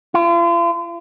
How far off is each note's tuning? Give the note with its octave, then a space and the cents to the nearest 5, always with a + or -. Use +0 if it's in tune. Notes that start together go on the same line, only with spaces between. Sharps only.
F4 -40